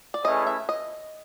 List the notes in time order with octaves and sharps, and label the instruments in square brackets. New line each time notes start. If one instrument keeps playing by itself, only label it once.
[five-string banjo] D5
[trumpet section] A3 C#4 E4 G#4 B4 [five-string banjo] D#5
[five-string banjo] E5
D#5